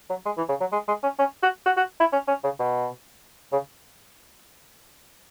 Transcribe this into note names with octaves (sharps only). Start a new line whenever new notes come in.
F#3
G#3
E3
C#3
F#3
G#3
G#3
C#4
C#4
F#4
F#4
F#4
E4
C#4
C#4
C#3
B2
C#3